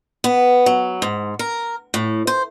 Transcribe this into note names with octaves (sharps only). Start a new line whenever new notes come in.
B3
F#3
G#2
A#4
A2
C5